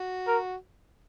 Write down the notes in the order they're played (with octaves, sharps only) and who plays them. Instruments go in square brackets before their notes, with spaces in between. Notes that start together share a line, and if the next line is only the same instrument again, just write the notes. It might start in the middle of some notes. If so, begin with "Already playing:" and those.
Already playing: [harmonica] F#4
[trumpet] A#4